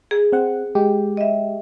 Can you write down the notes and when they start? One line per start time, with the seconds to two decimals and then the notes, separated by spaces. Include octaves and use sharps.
0.11 G#4
0.32 C4 F#5
0.75 G#3 G4
1.17 D#5 E5